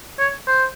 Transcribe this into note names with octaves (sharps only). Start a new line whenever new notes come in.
C#5
C5